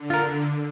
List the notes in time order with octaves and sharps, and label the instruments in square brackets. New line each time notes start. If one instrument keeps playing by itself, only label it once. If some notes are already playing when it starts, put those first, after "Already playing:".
Already playing: [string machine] D3
[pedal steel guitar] F4 A#4